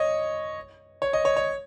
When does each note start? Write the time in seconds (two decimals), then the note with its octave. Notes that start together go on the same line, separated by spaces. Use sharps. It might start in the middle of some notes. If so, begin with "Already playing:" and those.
Already playing: C#5 D#5
1.02 C#5
1.13 D#5
1.25 C#5
1.36 C#5